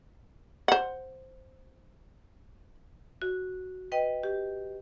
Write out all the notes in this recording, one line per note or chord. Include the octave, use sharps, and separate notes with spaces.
C5 F#5
F#4
B4 D#5 G5
G4